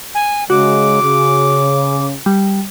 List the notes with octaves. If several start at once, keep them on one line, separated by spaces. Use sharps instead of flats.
G#5
C#3 G#3 F#4 D6
C#3
G3